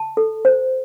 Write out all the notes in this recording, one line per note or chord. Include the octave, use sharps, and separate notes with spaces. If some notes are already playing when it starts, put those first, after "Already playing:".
Already playing: A5
A4
C5